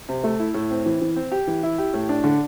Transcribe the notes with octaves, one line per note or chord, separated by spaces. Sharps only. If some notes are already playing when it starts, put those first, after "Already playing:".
C3
A3
E4
A2
C4
E3
E3
C4
G4
E3
E4
G4
A2
D4
D3